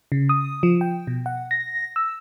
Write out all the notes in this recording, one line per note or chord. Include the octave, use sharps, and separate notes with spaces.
C#3
D#6
F3
G5
B2
F#5
A#6
E6